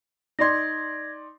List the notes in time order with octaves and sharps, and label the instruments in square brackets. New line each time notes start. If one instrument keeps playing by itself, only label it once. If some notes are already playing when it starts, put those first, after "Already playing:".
[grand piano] D#4 D5 C6 [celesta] G#6 A#6